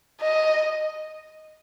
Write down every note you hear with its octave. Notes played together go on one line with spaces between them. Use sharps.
D#5